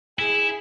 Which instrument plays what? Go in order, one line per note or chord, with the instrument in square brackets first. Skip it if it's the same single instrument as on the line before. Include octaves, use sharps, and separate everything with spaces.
[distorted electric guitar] E4 [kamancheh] G#4